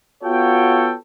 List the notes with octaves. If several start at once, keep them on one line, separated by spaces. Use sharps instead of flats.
B3 F4 F#4 A4 C#5 G5